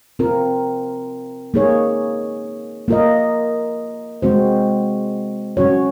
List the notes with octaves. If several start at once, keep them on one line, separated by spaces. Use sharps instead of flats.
C4 F4 A#4
A#3 D#4 G#4 C#5
A#3 F4 A#4 D#5
G#3 C4 F#4 C5
F#3 C#4 F#4 C#5